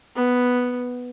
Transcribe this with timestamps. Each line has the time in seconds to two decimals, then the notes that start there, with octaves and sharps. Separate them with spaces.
0.16 B3